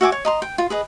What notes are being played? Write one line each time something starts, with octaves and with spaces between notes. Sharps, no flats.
F#4 E5 G#5 D6
C#5
D#5 A#5 C6
G5
F4
G#4 B4 D#5